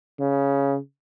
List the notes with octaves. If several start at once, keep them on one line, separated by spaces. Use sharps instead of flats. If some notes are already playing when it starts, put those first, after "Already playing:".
C#3